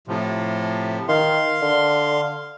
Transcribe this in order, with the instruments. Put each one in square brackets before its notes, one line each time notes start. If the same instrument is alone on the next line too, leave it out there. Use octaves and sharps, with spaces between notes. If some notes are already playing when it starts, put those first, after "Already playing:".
[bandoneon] A2 C3 F3
[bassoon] D#3 [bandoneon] F5 C6
[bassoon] D3